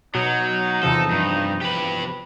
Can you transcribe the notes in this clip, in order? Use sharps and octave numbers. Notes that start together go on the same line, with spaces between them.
B2 F#3 D#4
E2 C3 F3 A4
G2
G4 B4